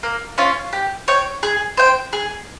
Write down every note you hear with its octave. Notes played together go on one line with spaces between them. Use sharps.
A#3
C#4 F4
G4
C#5 G5
G#4
C5 G5
G#4